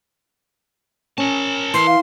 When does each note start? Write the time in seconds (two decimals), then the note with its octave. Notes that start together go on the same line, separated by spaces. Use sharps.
1.18 C#4 A#4 A5
1.74 E3 C6
1.87 F5